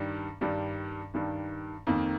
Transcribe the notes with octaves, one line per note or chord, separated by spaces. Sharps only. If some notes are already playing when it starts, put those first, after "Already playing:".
Already playing: G2 D#3 G3 D4
G2 D#3 G3 D4
G2 D#3 G3 D4
F2 D#3 A#3